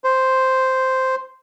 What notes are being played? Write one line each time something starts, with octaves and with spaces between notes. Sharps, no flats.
C5